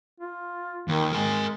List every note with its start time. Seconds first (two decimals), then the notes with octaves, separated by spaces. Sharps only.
0.20 F4
0.88 D#2 D#3
1.13 G#3 A#4 G#5